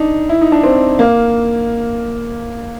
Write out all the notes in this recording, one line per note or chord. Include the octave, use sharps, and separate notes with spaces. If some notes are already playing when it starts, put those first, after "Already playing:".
Already playing: D4 D#4
E4
D#4
D4
C4
A#3